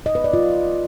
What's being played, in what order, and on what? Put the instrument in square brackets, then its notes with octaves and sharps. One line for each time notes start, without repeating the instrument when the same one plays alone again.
[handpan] D#5
B4
D5
F4